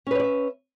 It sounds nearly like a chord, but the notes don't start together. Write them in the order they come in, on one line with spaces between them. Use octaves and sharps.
C#4 B4 C#5 D5 E5